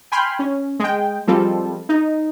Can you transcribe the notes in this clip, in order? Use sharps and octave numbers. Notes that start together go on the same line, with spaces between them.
G5 G#5 B5 C6 F6 G6
C#4
G#3 G5
F3 G3 G#3 C4 F4 A4
D#4